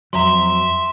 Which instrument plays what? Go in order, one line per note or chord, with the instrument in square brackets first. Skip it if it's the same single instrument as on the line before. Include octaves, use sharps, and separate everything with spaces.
[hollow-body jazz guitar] F2 F#3 [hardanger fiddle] E5 [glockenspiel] A#5 C6